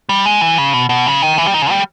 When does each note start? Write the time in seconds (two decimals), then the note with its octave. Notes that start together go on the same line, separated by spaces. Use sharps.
0.09 G3
0.26 G#3
0.41 E3
0.58 C#3
0.74 B2
0.89 B2
1.07 C#3
1.22 D#3
1.38 E3
1.46 G3
1.54 D#3
1.62 C#3
1.71 G3